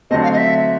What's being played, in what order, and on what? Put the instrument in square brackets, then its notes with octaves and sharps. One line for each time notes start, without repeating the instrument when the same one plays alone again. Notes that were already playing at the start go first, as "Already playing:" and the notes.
[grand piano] D3 F#3 A3 C4 [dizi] D#5
[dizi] F5
D#5
E5